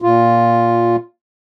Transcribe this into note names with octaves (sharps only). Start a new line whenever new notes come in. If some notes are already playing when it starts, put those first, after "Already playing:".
A#2 F4